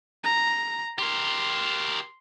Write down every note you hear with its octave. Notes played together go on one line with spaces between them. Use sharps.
A#5
G4 A#4 C6